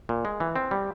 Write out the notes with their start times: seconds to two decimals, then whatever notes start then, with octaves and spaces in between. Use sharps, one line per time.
0.09 A#2
0.25 G#3
0.40 E3
0.56 C4
0.71 G3